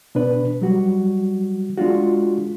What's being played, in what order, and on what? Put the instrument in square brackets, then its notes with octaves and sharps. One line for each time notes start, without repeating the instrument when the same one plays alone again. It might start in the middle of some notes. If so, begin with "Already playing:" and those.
[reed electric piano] B2 D4 B4
F#3 G3 F#4
G#3 D4 F4 F#4